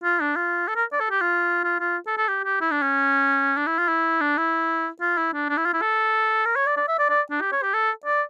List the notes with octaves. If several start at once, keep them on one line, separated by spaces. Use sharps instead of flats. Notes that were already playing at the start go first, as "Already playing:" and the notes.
F4
D4
F4
A4
A#4
D5
A4
G4
F4
F4
F4
A4
A4
G4
G4
E4
D4
C#4
D4
E4
F4
E4
D4
E4
F4
E4
D4
D4
E4
F4
E4
A4
A#4
C#5
D5
D5
E5
D5
D5
D4
G4
C#5
G4
A4
D5